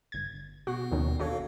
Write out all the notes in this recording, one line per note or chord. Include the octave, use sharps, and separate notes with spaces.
G1 G#6
B2 B3 F#4
D#2 D#3 C#4
G1 D4 F#4 A4 C#5 F5